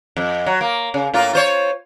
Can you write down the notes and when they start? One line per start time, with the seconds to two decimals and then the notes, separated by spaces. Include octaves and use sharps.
0.17 F2
0.46 F#3
0.61 A#3
0.94 C#3
1.14 A2 A#3 F4
1.33 F4 C5 C#5